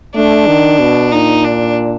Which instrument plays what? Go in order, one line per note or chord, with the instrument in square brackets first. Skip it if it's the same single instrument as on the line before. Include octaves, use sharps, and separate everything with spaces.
[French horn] A3 [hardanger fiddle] D4
[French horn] D#3
B2
[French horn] A#2 [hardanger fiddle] D#4
[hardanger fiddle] D4